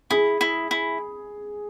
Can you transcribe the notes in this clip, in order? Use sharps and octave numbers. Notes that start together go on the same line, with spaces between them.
E4 G#4
E4
E4